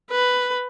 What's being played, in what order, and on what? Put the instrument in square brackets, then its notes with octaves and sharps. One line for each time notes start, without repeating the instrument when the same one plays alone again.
[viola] B4